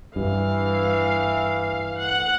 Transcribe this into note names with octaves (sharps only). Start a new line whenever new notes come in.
G2 E3 F5
F#5